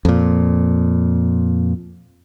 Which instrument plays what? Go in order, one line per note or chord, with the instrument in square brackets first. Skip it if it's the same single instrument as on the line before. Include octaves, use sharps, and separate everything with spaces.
[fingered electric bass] F2 A#2